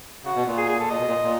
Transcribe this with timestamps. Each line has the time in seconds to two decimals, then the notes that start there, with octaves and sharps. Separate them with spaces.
0.24 C#3 F#4
0.35 B2
0.46 A#2
0.57 G#4
0.68 G#4
0.80 A4
0.90 A#2 D#5
0.99 B2
1.08 A#2
1.24 A#2